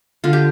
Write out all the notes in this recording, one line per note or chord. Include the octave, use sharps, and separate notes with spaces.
D3 F4
G4